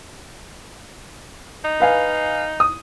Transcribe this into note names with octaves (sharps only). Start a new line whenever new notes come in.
D#4
B4 F5 G#5
D#6